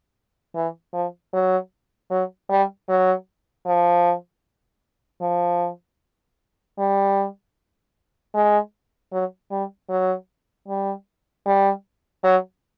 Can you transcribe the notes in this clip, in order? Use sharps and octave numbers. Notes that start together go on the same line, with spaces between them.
E3
F3
F#3
F#3
G3
F#3
F3
F3
G3
G#3
F#3
G3
F#3
G3
G3
F#3